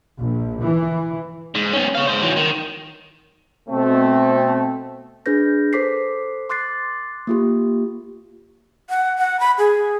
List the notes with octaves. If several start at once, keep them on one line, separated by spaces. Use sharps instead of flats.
A#1
E3
G#2
B3 C#4
C#5 F5
G#2 C5
E3 F#3
D#3
B2 A3 C4
D4 G#4 B4 G6 A#6
A4 C5 D6 B6 C7
C6 D6 F#6 A6 C7
A#3 F4 G4
F#5
F#5
B5
G#4